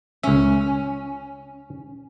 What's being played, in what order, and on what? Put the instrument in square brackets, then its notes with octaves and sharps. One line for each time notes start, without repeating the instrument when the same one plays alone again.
[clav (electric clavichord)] C#2 E5 [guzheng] C#4